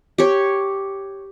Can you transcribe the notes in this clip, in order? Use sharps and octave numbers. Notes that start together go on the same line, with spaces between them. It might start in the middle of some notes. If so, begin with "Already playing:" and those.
G4 C#5